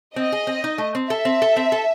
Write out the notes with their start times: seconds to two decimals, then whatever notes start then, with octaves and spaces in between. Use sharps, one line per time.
0.16 C4 D#5
0.32 G#4
0.47 C4
0.64 D#4
0.78 A3
0.95 C4
1.10 A4 E5
1.25 C4
1.42 A4
1.56 C4
1.72 A4